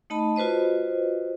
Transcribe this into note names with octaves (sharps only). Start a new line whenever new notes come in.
A3 D#4 D#5 A5 B5
F4 F#4 B4 C5 D#5